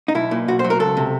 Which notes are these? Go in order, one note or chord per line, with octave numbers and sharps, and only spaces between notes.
D#4
B1 E4
A#2
B1 F#4
C5
F#3
A#4
C#2 A4
C3